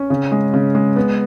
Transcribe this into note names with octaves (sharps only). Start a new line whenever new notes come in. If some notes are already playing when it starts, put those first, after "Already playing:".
Already playing: C#4
C#3
G#3
C#3
G#3
B3